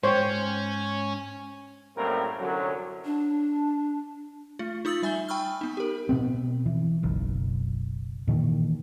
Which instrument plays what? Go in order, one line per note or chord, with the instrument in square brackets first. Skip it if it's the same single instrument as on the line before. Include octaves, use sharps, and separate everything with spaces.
[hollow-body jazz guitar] G#2 G5 [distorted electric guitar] C#4 [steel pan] C5 C#5
[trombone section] F#2 A2 G3 A#3 C4 A#4
C2 F#2 D3 F#3
[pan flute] D4
[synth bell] A3 F4
D#4 F4 D#6 E6 A6 F#7
G3 E5 G#5 G6 G7
G5 B5 C#6 E6 F6
B3 D#4
G4 A#4
[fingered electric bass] B2 B3 C4
E3
F#1 B1
A#2 D#3 E3